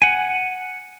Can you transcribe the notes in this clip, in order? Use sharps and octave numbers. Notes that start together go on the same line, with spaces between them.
F#5 G#5